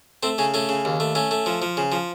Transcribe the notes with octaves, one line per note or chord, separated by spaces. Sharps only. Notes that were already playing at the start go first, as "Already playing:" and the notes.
A3 C4
C#3 C#4
A3 C#4
C#3
D#2
A3
A3 C#4
A3
F3
F3
C#3
F3